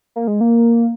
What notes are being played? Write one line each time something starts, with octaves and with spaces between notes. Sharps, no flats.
A#3
G#3
A#3